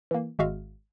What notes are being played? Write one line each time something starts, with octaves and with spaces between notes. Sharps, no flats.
E3 A#3
G#1 G#3 F#4 E5 F5 F6